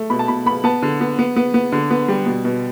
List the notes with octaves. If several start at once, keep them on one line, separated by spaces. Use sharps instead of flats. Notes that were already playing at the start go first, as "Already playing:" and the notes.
Already playing: A3
B2 B5
A5
B2 B5
B3 B5
B3 A5
D3
B3
B3
B3
B3
D3
B3
G3
B2
B2